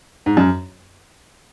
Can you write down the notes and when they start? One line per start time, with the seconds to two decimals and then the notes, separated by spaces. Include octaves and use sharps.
0.26 G#2
0.37 F#2